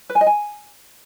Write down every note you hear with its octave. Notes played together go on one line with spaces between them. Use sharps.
B4
G#5
D#5
G#5